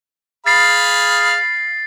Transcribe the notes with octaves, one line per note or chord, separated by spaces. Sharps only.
G#4 F5 B5 A6 C7